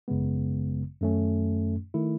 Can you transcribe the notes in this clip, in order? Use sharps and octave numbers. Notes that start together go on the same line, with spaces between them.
G#1 F#2 C#3 G#3 B3
F#2 D#3 A3 C#4
D#3 A3 E4